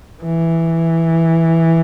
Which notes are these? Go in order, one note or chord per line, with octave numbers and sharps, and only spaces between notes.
E3